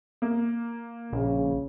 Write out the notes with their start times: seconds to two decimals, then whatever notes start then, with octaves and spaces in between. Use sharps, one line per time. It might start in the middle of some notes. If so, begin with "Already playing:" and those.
0.22 A#3
1.13 A#1 C#3